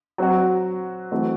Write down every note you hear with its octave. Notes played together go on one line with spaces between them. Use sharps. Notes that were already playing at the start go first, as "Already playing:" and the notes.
F#3 C4 F#4
E3 A3 C4 F#4